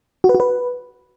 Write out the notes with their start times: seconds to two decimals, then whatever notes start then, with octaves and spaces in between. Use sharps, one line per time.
0.24 F#4
0.29 B4
0.35 F#4
0.40 B4